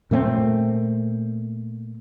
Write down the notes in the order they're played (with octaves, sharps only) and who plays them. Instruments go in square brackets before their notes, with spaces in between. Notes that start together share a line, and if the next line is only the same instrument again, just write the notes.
[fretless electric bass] A#2 A3 A#3 C4